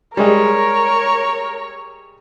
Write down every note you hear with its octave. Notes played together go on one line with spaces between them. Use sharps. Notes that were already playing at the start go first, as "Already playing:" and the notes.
G3 G#3 G#4 A#4 C#5